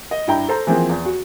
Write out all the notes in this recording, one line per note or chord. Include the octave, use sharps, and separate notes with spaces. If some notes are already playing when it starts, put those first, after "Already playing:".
D#5
G2 E4 G5 A#5
A4 C5 A#5
E3 F3 A#3 C4 G#4
E2
F#4